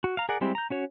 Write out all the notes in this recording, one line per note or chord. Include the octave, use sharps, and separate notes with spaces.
F#4
F5 A#5
G#4 A#4 D5 F#5
G3 G#3 C4 E4 G4
A#5 G6
C#4 F#4 C#5